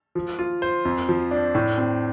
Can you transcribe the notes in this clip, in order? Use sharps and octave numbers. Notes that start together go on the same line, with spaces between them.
F3
F4
C5
F2
F3
D4
A2
C4